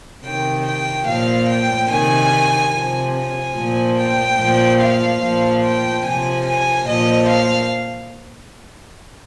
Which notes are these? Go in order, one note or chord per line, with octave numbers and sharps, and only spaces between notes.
C3 D#3 G5
G5
A#2 F3 F5
G5
C3 D#3 G#5
C3 F3
G#5
A#2 F3
G5
A#2 F3
F5
A#2 F3
G5
C3 F3 G#5
G#5
A#2 F3 D#5
F5